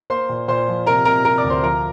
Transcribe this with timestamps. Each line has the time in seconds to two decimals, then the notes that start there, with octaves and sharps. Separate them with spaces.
0.10 A#3 C5 C6
0.29 A#2
0.48 A#2 C5 C6
0.68 F3
0.86 C3 A#4 A#5
1.05 C3 A#4 A#5
1.25 C3 A#4 A#5
1.38 D5 D6
1.44 D2
1.50 C5 C6
1.63 F3 A#4 A#5